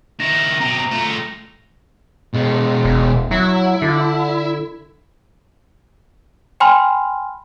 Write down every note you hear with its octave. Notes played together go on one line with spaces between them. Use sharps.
D#3 E4 A#6 F7
B2 C4 A#5
A3 F4
B2 G#3
E1
F#3 E4
D3
G5 G#5 B5 C6 F6